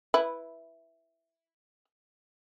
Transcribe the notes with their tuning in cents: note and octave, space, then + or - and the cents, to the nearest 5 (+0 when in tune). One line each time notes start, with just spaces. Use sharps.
E4 +0 B4 -5